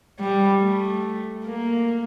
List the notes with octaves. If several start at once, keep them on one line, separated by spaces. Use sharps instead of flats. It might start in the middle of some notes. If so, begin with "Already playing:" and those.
G3
A3
A#3